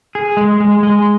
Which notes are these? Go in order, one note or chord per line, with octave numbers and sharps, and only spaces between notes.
G#4
G#3
G#3
G#3